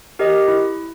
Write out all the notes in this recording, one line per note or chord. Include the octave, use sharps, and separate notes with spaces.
G4 A#4 D#5
E4